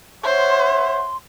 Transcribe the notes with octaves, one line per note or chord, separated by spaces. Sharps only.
C5 C#5 E5 F#5 C6